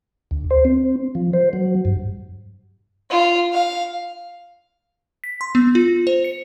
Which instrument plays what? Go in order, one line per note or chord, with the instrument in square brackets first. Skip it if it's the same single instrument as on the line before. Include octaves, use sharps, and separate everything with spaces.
[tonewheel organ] D2
C5
C4
F3
C5
F#3
G2
[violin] F4
F5
[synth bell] B6
C6
B3
F4
C5
C#7